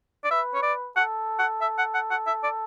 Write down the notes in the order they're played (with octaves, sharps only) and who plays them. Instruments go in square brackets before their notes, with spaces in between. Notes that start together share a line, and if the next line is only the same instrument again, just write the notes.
[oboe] D5
[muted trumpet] B4 [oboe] E5
[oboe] C#5
D5
[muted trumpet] A4 [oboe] F#5
[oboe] F#5
E5
F#5
F#5
F#5
E5
D5